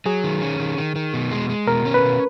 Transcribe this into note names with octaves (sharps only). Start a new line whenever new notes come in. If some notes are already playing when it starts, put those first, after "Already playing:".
F#3 G#4
D#3
C#4
D#3
D#3
D#3
B2
G#3
G#3
B2 A#4
C#4
B4
B2